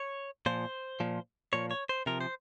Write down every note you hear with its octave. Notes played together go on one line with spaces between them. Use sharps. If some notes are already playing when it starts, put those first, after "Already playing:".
Already playing: C#5
A#2 F3 C5
A#2 F3
A#2 F3 C#5
C#5
C5
C3 F3 A#4
C5